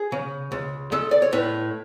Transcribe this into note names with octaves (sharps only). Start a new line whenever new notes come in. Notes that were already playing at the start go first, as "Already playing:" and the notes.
Already playing: G#4
C#3
C#2
G#3 A4
D5
C#5
A2 B4